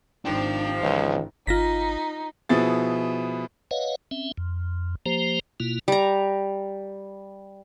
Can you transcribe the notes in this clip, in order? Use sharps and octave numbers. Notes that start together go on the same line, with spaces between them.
G#1 C3 D#3 F3 D4 G5
C#2 G#2 E3
G#1 D#4 F4 A#6 B6
B2 F3 B3 E4 G#4 A6
B4 C#5 D#5 F5 F#5
C4 C#4 E5
F2
F3 A#3 G4 C5 A#5
B2 A#3 E4 F4
G3 A#5